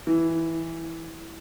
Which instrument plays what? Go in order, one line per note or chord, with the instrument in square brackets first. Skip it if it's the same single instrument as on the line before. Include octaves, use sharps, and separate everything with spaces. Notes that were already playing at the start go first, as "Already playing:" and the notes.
[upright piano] E3